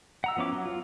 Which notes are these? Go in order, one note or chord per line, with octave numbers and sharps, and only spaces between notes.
F#5 A#5 E6
F3 B3 C#4 E4 D6
F#3
F4